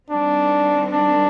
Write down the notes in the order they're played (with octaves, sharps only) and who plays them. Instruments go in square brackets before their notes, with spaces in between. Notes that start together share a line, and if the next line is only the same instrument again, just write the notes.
[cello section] D#3 G3 C4 [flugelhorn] D4
[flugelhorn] D4